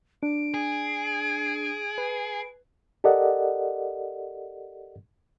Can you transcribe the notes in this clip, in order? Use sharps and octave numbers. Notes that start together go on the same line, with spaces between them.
D4 D7
G#4
B4
G4 A4 A#4 D5 D#5 F#5